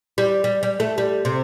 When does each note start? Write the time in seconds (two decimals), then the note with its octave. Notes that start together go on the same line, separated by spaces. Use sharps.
0.18 G3
0.44 G3
0.63 G3
0.80 A3
0.98 G3
1.25 C3